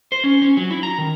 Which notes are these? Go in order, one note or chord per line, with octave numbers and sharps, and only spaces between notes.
C5
C#4
C#4
F#3
E4
A#5
D#3